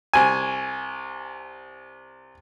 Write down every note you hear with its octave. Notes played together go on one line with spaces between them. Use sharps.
C2 G#5